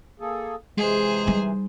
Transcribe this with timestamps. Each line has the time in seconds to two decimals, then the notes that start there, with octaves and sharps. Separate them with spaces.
0.20 A#3 G#4 A4
0.77 C3 E3 G#3 G#4 C5
1.27 G3 D#4